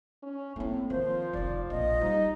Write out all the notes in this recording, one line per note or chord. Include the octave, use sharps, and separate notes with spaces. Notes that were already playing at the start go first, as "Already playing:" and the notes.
C#4
A2 A#3 C4
D#3 F3 C5
F1 D#3 D5
A#1 D#5
G3 D#4